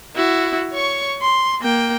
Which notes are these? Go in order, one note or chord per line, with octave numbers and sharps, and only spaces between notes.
E4 F#4
C#5 C#6
C6
A#3 G5